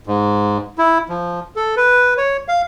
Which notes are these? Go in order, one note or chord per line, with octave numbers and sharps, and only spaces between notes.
G#2
E4
F3
A4
B4
C#5
F5